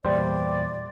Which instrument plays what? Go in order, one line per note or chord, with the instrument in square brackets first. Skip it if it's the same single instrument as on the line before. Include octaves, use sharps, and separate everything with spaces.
[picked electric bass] E2 A#2 [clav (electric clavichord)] G3 C5 [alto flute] D5